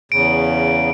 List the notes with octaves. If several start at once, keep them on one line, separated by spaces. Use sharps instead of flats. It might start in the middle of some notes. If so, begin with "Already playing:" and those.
E2 C#3 D7